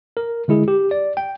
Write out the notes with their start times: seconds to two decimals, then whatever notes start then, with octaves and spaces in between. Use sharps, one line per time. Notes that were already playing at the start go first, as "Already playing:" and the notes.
0.17 A#4
0.48 D3 G#3 E4 G#4
0.68 G4
0.91 D5
1.17 G5